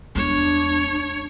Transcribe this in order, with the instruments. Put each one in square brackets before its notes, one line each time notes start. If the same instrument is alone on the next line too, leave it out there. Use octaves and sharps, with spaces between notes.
[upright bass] E2 G#3 [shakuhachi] D4 [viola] C#5